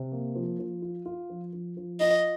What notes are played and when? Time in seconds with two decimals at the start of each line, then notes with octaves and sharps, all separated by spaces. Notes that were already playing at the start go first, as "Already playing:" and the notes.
Already playing: C3
0.12 A#3
0.35 F3
0.59 F3
0.82 F4
1.06 F4
1.30 F3
1.53 F3
1.77 F3
2.00 F4 D#5